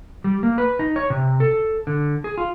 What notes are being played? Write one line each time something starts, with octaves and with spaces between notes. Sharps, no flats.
G3
A#3
B4
D#4
C#5
C3
A4
D3
G#4
F4